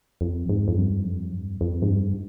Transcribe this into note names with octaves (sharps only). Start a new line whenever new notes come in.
F2
G#2
F2
G2
F2
G2
F2
G#2
G2